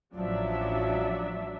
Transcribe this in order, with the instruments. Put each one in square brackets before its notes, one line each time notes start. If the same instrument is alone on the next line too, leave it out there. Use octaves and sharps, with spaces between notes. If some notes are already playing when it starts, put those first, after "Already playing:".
[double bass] A1 F3 [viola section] F#3 D4 E5